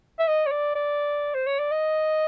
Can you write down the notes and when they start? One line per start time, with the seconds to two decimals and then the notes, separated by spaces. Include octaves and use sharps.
0.19 E5
0.27 D#5
0.46 C#5
0.51 D5
0.75 D5
1.35 C5
1.47 C#5
1.59 D5
1.71 D#5